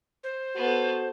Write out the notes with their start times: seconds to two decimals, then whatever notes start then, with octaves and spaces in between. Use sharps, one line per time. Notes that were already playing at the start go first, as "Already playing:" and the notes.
0.24 C5
0.56 B3 F#4 A4